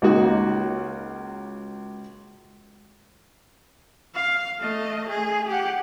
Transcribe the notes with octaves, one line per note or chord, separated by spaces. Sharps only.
C#2 A#3 D#4 F#4
F5
A3 D#5
G#4
G4 F#5